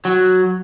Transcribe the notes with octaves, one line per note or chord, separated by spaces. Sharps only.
F#3